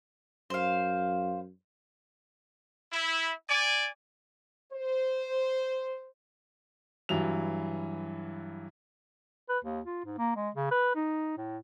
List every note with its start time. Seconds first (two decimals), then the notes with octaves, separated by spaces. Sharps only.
0.50 F#2 C5 F5
2.92 E4
3.48 D5 G#5
4.73 C5
7.09 G2 E3 F#3 F7
9.49 B4
9.64 D#2
9.85 F4
10.05 G#2
10.18 A#3
10.36 G#3
10.55 C#3
10.71 B4
10.95 D#4
11.37 A2